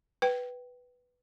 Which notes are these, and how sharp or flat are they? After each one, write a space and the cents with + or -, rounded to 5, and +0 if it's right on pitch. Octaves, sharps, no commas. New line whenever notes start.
B4 +0 G5 -15